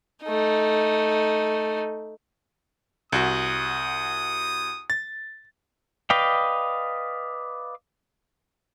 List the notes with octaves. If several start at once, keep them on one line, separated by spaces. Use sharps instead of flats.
A3 D#4
C2 F#4 D#6
A6
B4 D5 D#5 F5 G5